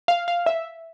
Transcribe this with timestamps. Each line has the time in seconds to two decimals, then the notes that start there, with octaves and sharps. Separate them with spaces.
0.08 F5
0.28 F5
0.46 E5